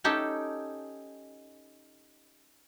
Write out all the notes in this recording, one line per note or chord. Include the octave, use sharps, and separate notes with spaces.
C#4 D#4 G4 A4